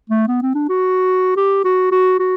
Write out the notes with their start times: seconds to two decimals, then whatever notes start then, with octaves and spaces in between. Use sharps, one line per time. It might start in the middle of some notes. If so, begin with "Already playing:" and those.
0.10 A3
0.28 B3
0.42 C4
0.55 D4
0.69 F#4
1.37 G4
1.65 F#4
1.92 F#4
2.19 F#4